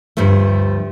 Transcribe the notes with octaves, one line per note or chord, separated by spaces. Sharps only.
D2 G2 F3 A3